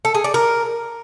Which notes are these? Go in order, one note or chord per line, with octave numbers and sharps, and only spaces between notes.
A4
G#4
D5
A#4